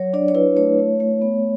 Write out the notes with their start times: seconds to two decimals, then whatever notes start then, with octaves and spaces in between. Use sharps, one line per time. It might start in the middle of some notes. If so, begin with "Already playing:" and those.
Already playing: F#3 C#5
0.13 D4 D5
0.28 C#5
0.35 E4 B4
0.57 A3 C#5
0.79 A3
1.00 A3
1.22 B3